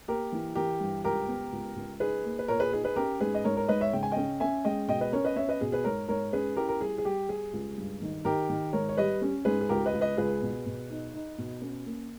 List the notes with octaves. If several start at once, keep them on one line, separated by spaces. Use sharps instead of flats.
A#3 G4 A#4
E3
E3 G4 A#4
G2
C#2 G4 A#4
B3
C#2
C#2
D#4 G#4 B4
A#3
B4
A#2 A#4 C#5
G#4 B4
D#4 G#4
G#4 B4
C#4 G4 A#4
G#2 G#4 B4
D#5
G#2 A#4 C#5
A#4 C#5
G#2 B4 D#5
C#5 E5
C#3 G5
G#5
C#4 D#5 G5
C#4 E5 G#5
G#3 D#5 G5
B2 D#5 G5
B4 D#5
C#4 A#4 C#5
B4 D#5
C#4 C#5 E5
B4 D#5
B2 G#4
G#4 B4
G#2 A#4 C#5
G#2 A#4 C#5
C#4 G#4 B4
E4 G4 A#4
A#4
G3 G#4
G#4
G3 G4
G3 G#4
C#2
G2
D#3
D#3 G4 A#4
D#3
G#2 A#4 C#5
C#5
G3 B4 D#5
C#4
G#2 G#4 B4
G#4
C#2 G4 A#4
B4 D#5
C#2
B4 D#5
C#2 G#4 B4
B2
B2
D#4
D#4
B2
C#4
A#3